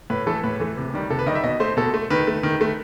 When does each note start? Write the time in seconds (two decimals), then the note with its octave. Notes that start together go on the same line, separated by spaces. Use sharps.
0.10 A2 B4
0.26 E3 A3 A4
0.43 A2 B4
0.60 E3 A3
0.77 C3
0.94 D#3 G3
1.10 C3 A4
1.19 B4
1.26 D#3 D#5
1.30 G3 E5
1.43 B2 D#5
1.60 A3 C5
1.77 B2 A4
1.94 A3
2.10 D#3 B4
2.27 A3
2.43 D#3
2.61 A3